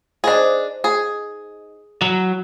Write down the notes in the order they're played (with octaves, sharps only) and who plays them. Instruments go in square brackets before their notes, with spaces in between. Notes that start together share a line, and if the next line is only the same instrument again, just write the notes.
[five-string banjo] D4 G#4 [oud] D#4 C5 D#5
[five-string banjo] G#4
[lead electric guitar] F#3 [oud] E4